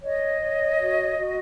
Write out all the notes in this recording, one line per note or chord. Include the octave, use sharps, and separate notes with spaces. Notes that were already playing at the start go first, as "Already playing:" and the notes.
C#5 D#5
C#5
F#4
F#4